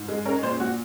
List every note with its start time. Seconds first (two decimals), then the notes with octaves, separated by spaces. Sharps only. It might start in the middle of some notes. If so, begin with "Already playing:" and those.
Already playing: G#2
0.08 G#3
0.25 C#4 A#4
0.43 A#2 C5
0.60 A#2 F#4